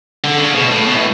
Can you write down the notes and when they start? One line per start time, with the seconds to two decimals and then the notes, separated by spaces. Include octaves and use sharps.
0.24 D3
0.38 C#3
0.55 B2
0.69 A2
0.85 B2
0.94 A2